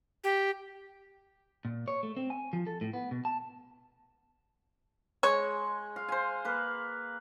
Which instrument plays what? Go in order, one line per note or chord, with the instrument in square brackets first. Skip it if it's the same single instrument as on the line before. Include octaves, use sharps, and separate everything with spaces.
[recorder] G4
[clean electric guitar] A#2
C#5
A3
C4
G#5
F3
A4
A2
B3
B2
A5
[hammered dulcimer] G#3 [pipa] C#5
[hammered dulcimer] F5
C5 G#5
A#3 B4